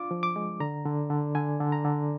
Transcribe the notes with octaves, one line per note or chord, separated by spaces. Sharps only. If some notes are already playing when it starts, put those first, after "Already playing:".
Already playing: D4 F4 D6
F3
D6
G#3
D3 A#5
D3
D3
D3 G#5
D3
A#5
D3